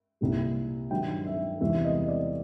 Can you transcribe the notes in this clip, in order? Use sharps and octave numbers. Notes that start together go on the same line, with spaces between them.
C2 A#2 G3
G2 D#3 F#3 G5
E5
E2 C3 E3 G3 E5
D#5
D5